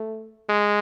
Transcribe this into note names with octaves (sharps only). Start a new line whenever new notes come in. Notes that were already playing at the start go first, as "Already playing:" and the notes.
Already playing: A3
G#3